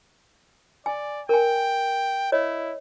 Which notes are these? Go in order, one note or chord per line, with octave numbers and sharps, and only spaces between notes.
D5 G#5
A#4 G5 G#5
E4 C#5 D#5